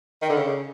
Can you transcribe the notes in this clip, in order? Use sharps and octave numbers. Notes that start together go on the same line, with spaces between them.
D#3
D3
C#3